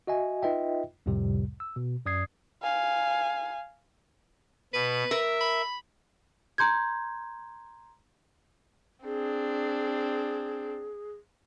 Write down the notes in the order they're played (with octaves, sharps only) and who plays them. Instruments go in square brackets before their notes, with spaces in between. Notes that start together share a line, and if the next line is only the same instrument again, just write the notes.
[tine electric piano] F#4 D#5 E5 G#5
D#4 F4 B4 D#5 E5 G5
C2 F2 A2 C3 G3
E6
B2
F#2 D5 D#6 G#6 C7
[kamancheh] F5 G#5
[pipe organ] B2 [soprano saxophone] B4
[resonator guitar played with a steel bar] A#4 [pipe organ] E5
[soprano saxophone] B5
[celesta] A#5 C6 G6 G#6
[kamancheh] C4 D4 [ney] G#4